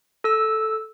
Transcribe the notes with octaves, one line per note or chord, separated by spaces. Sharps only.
A4 E6